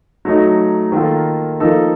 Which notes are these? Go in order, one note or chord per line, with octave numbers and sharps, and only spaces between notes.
F#3 A3 D#4
D#3 A#3 F4 A4
F3 A#3 D#4 A4